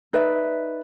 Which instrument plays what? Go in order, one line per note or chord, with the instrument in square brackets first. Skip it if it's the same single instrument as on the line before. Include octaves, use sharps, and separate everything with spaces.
[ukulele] D#4 B4 D5 E5